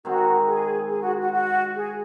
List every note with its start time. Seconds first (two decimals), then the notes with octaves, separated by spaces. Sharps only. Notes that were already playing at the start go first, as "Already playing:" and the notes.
0.05 D#3 G#3 C4 F#4
0.47 G#4
0.90 G#4
1.01 F#4
1.21 F#4
1.33 F#4
1.75 G#4